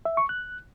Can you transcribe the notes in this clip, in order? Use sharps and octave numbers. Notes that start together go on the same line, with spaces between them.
E5
C#6
F#6